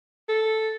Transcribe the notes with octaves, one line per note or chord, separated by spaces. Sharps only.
A4